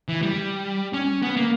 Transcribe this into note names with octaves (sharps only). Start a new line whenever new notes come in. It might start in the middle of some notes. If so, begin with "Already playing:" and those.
E3
G3
C#4
B3
A#3